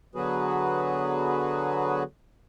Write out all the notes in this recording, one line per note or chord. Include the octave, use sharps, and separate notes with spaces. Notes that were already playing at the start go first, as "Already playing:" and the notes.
D3 F#3 B3 F#4 G#4 B4